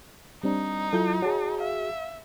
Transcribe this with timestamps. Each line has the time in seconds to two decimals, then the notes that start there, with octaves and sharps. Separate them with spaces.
0.43 G3 C4 D4 D#4
0.93 F#3 E4 F4 A4 G6
1.22 F#4 G#4 C#5 A5
1.61 E5 F5